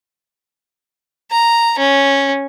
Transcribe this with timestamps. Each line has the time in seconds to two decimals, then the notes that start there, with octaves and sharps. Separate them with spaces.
1.31 A#5
1.79 C#4